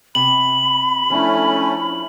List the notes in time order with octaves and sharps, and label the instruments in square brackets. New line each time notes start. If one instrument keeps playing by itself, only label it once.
[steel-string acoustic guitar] C3 [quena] B5 [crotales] F#7
[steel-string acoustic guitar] F3 D4 E4 [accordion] A3 C#4